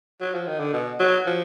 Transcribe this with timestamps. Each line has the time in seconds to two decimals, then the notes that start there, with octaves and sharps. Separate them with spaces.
0.21 F#3
0.35 F3
0.47 D#3
0.60 D3
0.73 B2
0.99 F#3
1.26 F3